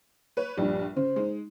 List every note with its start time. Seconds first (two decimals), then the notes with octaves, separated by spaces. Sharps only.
0.37 B4 C#5
0.58 A#1 G2 G3
0.96 C#3 C5
1.16 G#3 D#4